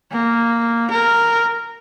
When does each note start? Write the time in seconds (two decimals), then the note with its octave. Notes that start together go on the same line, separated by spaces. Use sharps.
0.12 A#3
0.91 A#4